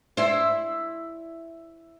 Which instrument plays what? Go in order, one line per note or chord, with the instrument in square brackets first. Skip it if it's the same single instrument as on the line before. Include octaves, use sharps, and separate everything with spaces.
[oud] E4 C5